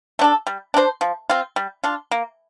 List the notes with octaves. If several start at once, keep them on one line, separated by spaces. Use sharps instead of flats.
A3 D4 A4
G3
D4 A4 C5
F3
C4 F4
G3
D4 F4
A#3